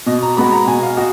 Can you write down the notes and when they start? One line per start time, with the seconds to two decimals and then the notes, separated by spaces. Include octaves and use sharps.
0.06 B2 D#5
0.23 A#5
0.37 G#3 B3 F#4 B5
0.52 A#5
0.67 B2 G#5
0.82 F5
0.97 F#4 D#5